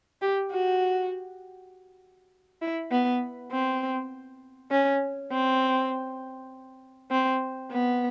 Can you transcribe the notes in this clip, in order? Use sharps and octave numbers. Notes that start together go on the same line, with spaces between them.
G4
F#4
E4
B3
C4
C#4
C4
C4
B3